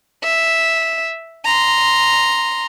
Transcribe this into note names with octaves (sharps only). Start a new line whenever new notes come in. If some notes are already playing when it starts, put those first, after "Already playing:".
E5
A#5 C6